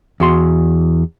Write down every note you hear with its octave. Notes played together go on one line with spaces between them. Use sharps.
E2 F#4 C6